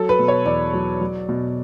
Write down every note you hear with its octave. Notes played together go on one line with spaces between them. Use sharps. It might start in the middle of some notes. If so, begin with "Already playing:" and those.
Already playing: F#3 A4
B4
B2
C#5
E2 D5
F#3
F#3
B2